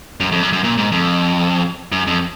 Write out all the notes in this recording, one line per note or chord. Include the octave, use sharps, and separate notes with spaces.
F#2
F2
F#2
F#2
A#2
G#2
F2
F#2
F2